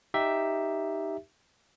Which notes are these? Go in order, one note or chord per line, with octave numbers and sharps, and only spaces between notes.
D#4 G4 E5